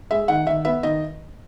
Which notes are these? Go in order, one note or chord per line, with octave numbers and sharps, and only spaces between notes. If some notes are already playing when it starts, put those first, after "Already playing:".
G#3 E5
D#3 F#5
D#3 E5
B3 E5
D#3 D#5